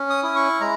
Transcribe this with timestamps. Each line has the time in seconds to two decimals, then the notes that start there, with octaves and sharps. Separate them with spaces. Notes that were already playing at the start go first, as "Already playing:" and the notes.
Already playing: C#4
0.10 D#6
0.23 E4 D#6
0.36 C#6
0.61 G#3 A#5